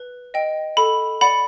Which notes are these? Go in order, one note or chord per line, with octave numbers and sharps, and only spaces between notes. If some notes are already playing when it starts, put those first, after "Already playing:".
Already playing: B4
D#5 G5
A4 B5
D5 F#5 B5